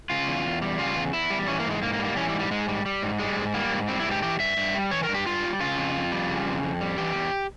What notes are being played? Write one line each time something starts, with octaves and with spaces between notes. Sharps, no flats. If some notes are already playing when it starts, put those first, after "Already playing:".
C#3 F4
E2
E2
G3
C#3 F4
E2
E2 E4
G3
E3 C#4
A#3
G#2
G#3
G#2 A#3
A#3
G3
A#3
E3 C#4
G3
G#2
G3
G#2 G#3
G3
G3
G#2
G3 G#3
G#2
G3 A#3
G#2
G3 C4
E4
G#2 G4
E3 G4
G2 E5
G2
G3
E3 C#5
A#4
G2
G4
G2 F4
G3
C#3 F4
F2
F2
G3
C#3
F2
F2
G3
E3 G4
E2